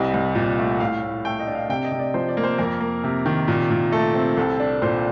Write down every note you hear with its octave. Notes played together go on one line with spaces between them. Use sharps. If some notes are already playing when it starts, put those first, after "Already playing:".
Already playing: C2 G3 C4 D#5
C2
A#2
A3
A2 F5
A2
A3 G5
D#5
D4
F5
C3 G5
D#5
C3
D5
F3 C5
D5
A#3
C5
F2 A#4
A#3
C3
D#3
A#2
A#2
A3 A4
C4
C2 A4
D4
A#2 C5